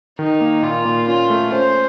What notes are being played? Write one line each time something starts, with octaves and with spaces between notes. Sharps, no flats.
D#3 D#4
A#3
A#2 F4
A#2
C#4 F4
A3
C#4 C5